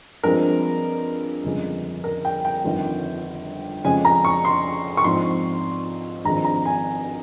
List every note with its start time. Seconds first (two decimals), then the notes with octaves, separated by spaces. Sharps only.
0.23 G2 F3 G#3 C4 A#4
1.44 G1 F2 C#3 G#3
2.04 A#4
2.25 G5
2.45 G5
2.64 G1 F2 D#3
3.85 F2 C#3 F3 G#3 C#4 G#5
4.05 A#5
4.25 C#6
4.45 C6
4.97 C#6
5.04 G#2 F3 C4 C6
6.25 G#1 G2 F3 G#3 C4 A#5
6.45 A#5
6.65 G#5